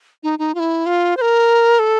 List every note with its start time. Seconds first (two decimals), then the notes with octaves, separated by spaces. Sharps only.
0.23 D#4
0.39 D#4
0.55 F4
0.59 E4
0.86 F4
1.17 C5
1.21 A#4
1.79 A4